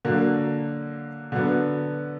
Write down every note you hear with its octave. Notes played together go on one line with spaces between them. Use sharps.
D3 F#3 A#3
D3 F#3 B3